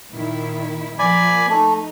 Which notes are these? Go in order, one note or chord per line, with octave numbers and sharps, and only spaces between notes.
A#2 D#3 E4
F3 A#3 D5 G#5 B5
A3 D#4